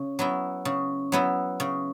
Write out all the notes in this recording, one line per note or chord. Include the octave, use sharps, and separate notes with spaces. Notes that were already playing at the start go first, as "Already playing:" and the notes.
Already playing: C#3
F#3 B3 E4
C#3
F#3 B3 E4
C#3